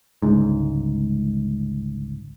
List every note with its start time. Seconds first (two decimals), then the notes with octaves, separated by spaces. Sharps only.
0.22 G1 C#2 G#2